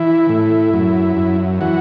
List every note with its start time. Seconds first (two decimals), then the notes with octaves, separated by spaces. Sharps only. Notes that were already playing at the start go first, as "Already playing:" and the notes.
Already playing: E3 E4
0.29 A2
0.73 F#2
1.17 F#2
1.61 E3 F#4